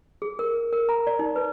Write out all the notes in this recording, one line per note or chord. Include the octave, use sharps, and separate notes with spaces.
G#4
A#4
A#4
A#5
D5
D#4
B4